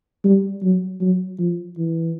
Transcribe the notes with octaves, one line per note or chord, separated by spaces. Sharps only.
G3
F#3
F#3
F3
E3